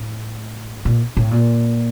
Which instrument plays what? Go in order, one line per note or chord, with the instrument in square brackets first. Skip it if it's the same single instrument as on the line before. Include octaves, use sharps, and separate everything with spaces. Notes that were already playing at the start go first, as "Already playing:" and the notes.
Already playing: [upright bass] A2
A#2
A2
A#2